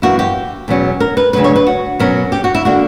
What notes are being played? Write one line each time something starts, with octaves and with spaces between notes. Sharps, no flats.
F#2 E3 A#3 E4 F#4
G4
E2 B2 F#3 C#4
A#4
B4
D2 C#3 F#3 B4
C#5
B4
F#4
B2 F#3 C#4 A#4
G4
F#4
E4
D3 A#3 F#4